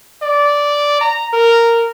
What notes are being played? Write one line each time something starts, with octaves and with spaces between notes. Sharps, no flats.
D5
A#5
A#4